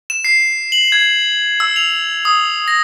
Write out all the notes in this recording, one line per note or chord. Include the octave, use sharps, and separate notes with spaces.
E7
C7
F#7
G#6
E6
F7
D#6
A#6